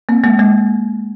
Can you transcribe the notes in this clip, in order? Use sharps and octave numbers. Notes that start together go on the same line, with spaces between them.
A#3 C4
G#3 A#3
G#3 A#3